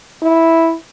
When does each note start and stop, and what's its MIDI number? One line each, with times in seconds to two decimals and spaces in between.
0.22 0.74 64